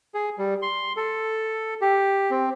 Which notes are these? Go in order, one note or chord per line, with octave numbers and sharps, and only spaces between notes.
G#4
G3
C6
A4
G4
C4